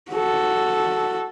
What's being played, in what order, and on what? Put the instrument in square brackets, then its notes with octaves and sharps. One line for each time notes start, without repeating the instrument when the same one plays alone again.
[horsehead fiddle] F#4 A4